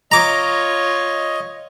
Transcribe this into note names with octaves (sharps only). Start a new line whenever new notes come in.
F4 C#5 D#5 A#5 D6